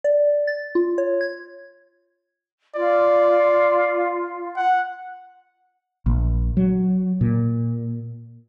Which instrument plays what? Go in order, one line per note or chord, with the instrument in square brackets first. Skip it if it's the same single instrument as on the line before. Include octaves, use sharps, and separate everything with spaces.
[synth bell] D5
A6
F4
C#5
G#6
[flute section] F4 [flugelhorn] D5
[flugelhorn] F#5
[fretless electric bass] A#1
F#3
A#2